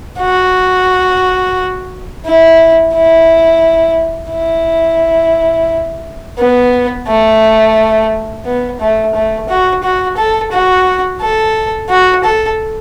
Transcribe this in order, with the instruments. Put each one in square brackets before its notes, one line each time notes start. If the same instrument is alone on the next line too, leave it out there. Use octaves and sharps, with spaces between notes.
[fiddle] F#4
E4
E4
E4
B3
A3
B3
A3
A3
F#4
F#4
A4
F#4
A4
F#4
A4